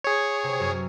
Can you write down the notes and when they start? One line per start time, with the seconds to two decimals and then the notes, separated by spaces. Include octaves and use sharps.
0.04 G#4 C#5
0.43 C3
0.60 F#2